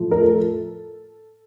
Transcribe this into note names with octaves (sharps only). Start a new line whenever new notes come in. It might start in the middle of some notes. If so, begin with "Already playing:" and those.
Already playing: A2 F3 A3
A#4
A4